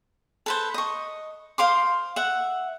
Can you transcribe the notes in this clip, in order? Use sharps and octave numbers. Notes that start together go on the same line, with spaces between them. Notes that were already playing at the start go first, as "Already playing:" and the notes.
A4 B4 C5
D#5 C#6
C5 F5 C6 D6
E5 F#5